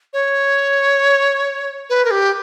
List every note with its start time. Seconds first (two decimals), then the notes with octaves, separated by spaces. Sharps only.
0.13 C#5
1.90 B4
2.05 A#4
2.11 G4